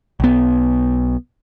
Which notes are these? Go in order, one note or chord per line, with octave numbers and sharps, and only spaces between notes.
B1 B3